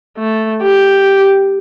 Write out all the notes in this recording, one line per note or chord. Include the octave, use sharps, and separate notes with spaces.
A3
G4